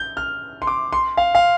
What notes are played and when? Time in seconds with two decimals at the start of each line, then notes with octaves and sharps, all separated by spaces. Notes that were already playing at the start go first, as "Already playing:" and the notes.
Already playing: G6
0.17 F6
0.62 C6
0.67 D6
0.93 C6
1.17 F5
1.35 F5